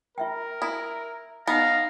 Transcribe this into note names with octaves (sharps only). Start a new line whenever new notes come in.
F4 A#4 E5 G5
E4 D#6
B3 D#4 D#5 F5 A#5